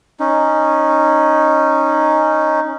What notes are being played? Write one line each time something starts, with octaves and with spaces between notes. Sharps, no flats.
C#4 D#4